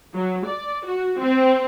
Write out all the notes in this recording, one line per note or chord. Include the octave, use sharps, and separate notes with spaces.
F#3
D5
F#4
C4